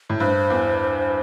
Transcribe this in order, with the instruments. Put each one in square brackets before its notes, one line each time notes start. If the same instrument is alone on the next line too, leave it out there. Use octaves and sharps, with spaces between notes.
[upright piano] A2
[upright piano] G2 [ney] C5
[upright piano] E2